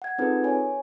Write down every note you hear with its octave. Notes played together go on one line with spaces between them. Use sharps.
F#5 G#6
C4 D#4 F4 G#4 A4 B4
C#5 G#5